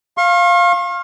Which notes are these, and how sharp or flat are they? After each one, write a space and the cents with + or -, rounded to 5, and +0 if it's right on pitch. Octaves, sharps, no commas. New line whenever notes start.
F5 +0 C#6 -45